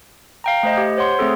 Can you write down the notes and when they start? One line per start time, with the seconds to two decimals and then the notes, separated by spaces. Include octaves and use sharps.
0.44 F5 G5 A#5
0.63 A3 C5 D#5
0.78 G4
0.97 C5 C#5 F#5 C6
1.19 A3 C4 G#4 A4